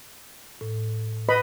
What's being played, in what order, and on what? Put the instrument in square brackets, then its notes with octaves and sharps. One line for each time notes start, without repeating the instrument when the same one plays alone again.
[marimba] A2
[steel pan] B4 D#5 B5